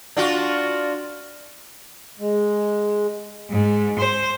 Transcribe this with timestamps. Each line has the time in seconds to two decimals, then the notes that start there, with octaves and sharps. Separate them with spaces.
0.17 D4 F4 F#4
2.19 G#3
3.50 G#2
3.99 C5